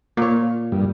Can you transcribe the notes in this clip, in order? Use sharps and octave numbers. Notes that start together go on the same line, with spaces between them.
A#2 A#3 C#5
G2